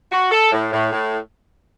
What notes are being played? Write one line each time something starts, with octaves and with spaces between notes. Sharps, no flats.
F#4
A4
A2
A2
A2